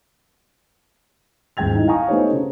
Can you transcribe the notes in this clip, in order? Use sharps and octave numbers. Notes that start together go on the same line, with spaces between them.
D#1 G#2 G5 G#6 F7
D#4 E4
F5 G5 G#5 A#5 C#6 D#6
A3 B3 D#4 G4 C5 C#5
C#3